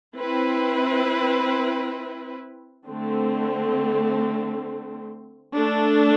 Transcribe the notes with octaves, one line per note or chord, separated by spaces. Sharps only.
C4 E4 B4
D3 A3 C4
A3 D4 A4